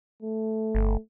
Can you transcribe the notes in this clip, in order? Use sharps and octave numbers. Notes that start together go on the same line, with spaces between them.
A3
G1